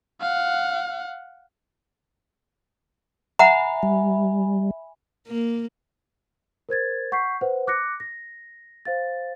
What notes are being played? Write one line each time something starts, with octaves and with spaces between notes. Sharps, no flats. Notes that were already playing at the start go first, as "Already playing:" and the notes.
F5 F#5
E5 F#5 G#5 A#5 B5
G3
A#3
A#4 C5 G#6 A6
F#5 C#6 G6 B6 C7
B4 C5 F#5
D6 F#6 A#6 C#7
A#6
C5 F5 A6